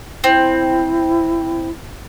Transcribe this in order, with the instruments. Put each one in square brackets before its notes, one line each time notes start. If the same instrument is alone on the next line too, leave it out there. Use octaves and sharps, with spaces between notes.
[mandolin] C4 [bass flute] E4